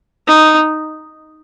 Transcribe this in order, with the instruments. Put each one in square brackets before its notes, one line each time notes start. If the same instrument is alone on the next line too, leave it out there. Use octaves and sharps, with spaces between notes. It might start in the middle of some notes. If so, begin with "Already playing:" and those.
[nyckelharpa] D#4